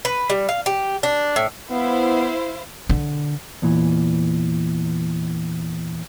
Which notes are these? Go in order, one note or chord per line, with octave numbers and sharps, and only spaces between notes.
B4
G3
F5
G4
D4
A2
B3 E4 C5 F5
D3
E2 A#2 E3